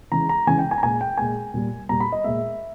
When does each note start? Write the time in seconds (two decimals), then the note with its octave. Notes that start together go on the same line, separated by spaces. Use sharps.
0.11 C#3 E3 G#3 A#5
0.29 A#5
0.47 C#3 E3 G#3 G#5
0.59 G5
0.71 G#5
0.78 A#5
0.83 A#2 G#3 G#5
1.01 G5
1.18 A#2 G#3 G#5
1.54 A#2 G3
1.89 A#2 G3 A#5
2.00 B5
2.12 D#5
2.24 A#2 G#3 E5